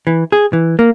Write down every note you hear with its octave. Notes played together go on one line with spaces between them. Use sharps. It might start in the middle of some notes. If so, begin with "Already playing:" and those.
E3
G#4
E3
A#3